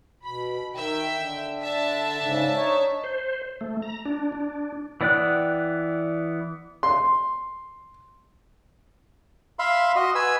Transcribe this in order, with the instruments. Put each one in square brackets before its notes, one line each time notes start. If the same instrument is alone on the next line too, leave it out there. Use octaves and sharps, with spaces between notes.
[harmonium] B2 [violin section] B5
[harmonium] D#3 [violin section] E5 G5
[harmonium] D3
[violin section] D4 E5 A5
[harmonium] G#2 C#3
D#4 C#5
[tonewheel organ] C5
A3
A#5
D4
D4
[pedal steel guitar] E3 B3 D5 G5 F#6
[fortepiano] C6
[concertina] E5 F5 B5 C6
F#4 D#5 C6
B4 G#5 E6